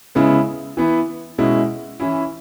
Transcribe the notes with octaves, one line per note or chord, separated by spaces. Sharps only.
C#3 G#3 B3 E4
E3 B3 E4
B2 G#3 C#4 E4
E3 C#4 E4